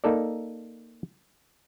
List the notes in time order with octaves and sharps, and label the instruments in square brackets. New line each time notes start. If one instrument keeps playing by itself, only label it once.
[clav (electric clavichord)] A#3 D#4 A4 D5